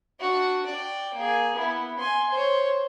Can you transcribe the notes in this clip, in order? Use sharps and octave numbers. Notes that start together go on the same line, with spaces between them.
D4 F#4
D5 G5
A#3 G#4
B3 E4
G#5 C6
C5 C#5